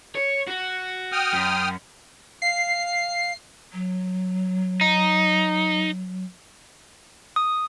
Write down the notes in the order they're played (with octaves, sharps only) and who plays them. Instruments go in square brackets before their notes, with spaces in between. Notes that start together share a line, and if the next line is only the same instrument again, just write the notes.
[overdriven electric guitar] C#5
F#4
[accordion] G5 D#6 F6
[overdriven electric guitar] F#2
[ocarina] F5 [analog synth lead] C7
[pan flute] F#3
[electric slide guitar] D#4
[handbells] D#6